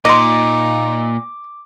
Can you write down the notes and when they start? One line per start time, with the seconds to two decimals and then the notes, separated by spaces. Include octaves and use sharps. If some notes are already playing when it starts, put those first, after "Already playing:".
0.05 A#2 D#4 D#5 C6 D6